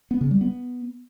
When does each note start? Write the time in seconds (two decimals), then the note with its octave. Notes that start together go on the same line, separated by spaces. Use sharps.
0.11 B3
0.21 C#3
0.31 G3
0.41 B3